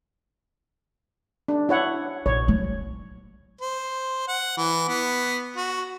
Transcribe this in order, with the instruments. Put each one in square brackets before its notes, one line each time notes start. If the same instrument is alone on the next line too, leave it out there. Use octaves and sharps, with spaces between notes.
[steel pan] D4
E4 C#5 F#5
[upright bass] A#1 [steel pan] C#5
[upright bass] F#3
[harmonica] C5
F#5
E3
B3
F#4